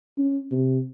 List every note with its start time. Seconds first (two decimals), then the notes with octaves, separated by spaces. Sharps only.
0.18 C#4
0.51 C3